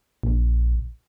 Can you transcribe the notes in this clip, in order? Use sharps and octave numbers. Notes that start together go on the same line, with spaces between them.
A#1